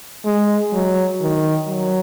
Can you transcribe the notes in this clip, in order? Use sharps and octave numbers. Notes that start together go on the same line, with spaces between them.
G#3
F#3
D#3
F#3